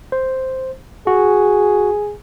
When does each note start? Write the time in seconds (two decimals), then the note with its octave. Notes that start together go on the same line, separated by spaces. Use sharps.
0.12 C5
1.07 F#4 G#4